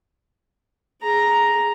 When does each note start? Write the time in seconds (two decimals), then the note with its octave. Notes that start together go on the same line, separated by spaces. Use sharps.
1.02 G#4 A#5